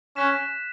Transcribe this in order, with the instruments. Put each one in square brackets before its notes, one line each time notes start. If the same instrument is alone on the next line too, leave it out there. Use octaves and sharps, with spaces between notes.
[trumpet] C#4 [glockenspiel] F#6 B6 E7